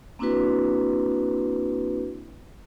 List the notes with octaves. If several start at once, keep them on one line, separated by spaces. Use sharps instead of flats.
A#3 C4 D4 E4 F#4 B4